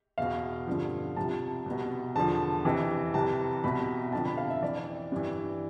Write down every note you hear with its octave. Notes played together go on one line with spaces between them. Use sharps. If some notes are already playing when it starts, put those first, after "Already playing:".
E2 B2 F5
G2 D3 F3
C2 C3 F3 A5
C2 B2
E2 D3 F3 A5
F2 C3 E3
C2 C3 E3 A5
C2 B2 B5
F2 D3 F3 A5
B5
F5
E5
F2 E3 D5
G2 E3